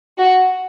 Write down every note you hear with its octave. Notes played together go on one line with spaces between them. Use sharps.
F#4